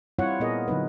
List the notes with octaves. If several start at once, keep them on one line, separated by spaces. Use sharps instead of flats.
G3 C4 E4 F4 C#5 F#5
A#2 B3 G#4 A#4 D#5
D3 F#3 D#4 B4